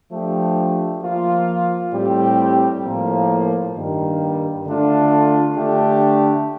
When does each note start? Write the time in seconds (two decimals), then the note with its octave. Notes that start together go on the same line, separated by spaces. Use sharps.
0.11 F3 A3 D4 G4
1.02 F3 A#3 F4
1.93 A2 G3 C4 G4
2.83 A2 F3 A#3
3.75 G2 D#3 G3 A#3
4.65 D3 A3 D4 F4
5.56 D3 A3 D4 G4